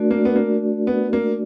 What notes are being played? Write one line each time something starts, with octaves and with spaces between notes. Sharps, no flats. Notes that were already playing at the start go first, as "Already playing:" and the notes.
Already playing: A3 D4 F#4 A#4 D5
A#3
B3
A#3
B3
A#3